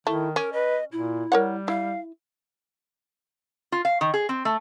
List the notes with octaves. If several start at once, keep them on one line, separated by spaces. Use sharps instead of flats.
D#3 A3 E4
C#4 A#4
B4 D#5
A#2 E4
G3 A#4 C#5 F#5
E4 F5
F4
F5
D#3
G#4
C4
A3